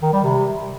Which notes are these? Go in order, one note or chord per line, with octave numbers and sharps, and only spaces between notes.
D#3
G3
C3